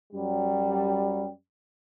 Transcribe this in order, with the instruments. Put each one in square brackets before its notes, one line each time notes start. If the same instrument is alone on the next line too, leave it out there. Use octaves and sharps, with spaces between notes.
[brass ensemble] F#2 F#3 G3